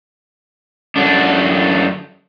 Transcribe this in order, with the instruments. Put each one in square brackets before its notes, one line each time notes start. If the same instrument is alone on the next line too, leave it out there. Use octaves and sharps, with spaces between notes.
[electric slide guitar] F#2 D3 D4